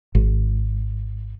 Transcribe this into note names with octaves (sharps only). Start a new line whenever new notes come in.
G#1